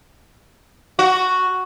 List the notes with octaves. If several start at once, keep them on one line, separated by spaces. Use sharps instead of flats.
F#4